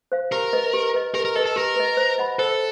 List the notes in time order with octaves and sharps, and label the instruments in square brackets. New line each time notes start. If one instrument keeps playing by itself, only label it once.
[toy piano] C5 F5
[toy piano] G4 [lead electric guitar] A#4
[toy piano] B4 D#5
G4
B4 D#5
[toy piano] G4 [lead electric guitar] A#4
[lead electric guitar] A#4
[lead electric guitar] A4 [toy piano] B4 D#5
[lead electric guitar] A4
[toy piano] G4 [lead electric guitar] A#4
[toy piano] B4 D#5
C5
D#5 F#5 B5
[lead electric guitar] A4 [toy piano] C5